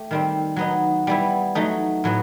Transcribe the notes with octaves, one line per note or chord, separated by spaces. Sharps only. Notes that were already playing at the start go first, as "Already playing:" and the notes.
Already playing: A3 G4
D#3 G3 C4
F#3 B3 D#4
G3 B3 E4
F#3 A3 D#4
A2 F#3 B3